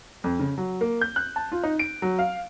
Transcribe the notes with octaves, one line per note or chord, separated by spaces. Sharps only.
F2
C#3
F#3
A#3
G6
F#6
A5
F4
D#4
D7
F#3
F5